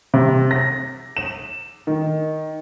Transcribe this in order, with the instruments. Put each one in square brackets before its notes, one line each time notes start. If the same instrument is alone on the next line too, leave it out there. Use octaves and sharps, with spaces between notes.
[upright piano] C3
A#6
E7
D#3